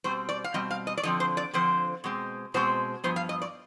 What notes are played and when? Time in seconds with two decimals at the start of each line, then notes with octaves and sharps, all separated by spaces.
0.04 B2 G3 C4 C5
0.29 D5
0.44 F5
0.54 B2 G3 C4 D#5
0.71 F5
0.87 D#5
0.97 D5
1.03 D3 F3 C4 D#5
1.20 C5
1.37 D5
1.53 D3 F3 C4 C5
2.04 B2 G#3 C4
2.54 B2 G#3 C4 C5
3.04 G2 F3 B3 C5
3.16 F5
3.29 D#5
3.42 D5